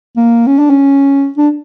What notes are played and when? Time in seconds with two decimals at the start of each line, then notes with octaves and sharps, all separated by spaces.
0.17 A#3
0.47 C#4
0.59 D4
0.70 C#4
1.38 D4